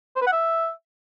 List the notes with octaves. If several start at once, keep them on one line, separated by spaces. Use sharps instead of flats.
C5
B4
F#5
E5